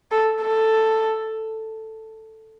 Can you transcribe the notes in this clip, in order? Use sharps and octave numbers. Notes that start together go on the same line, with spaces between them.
A4
A4